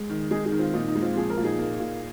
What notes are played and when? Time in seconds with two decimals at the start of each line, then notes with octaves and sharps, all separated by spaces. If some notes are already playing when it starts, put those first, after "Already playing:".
Already playing: G#3
0.09 D#3
0.31 G#3 D#4 G#4
0.45 D#4 G#4
0.52 D#3
0.59 C4 F4
0.74 A#2 D#4
0.88 D#4
0.95 G#3
1.02 C4 F4
1.16 F3 G#4
1.30 A#4
1.37 A#2
1.43 D#4 G#4
1.59 A#3
1.80 A#2